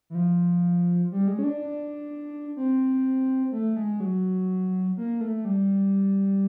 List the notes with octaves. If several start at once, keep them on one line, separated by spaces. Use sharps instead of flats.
E3
F3
G3
G#3
C#4
D4
D4
C4
A3
G#3
F#3
A#3
A3
G3